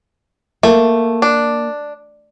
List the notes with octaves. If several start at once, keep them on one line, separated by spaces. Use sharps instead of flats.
A3 A#3
D4